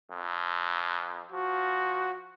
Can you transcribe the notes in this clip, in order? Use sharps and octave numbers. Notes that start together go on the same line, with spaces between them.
F2
F3 F#4